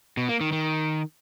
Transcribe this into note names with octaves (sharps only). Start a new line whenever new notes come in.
B2
A#3
D#3
D#3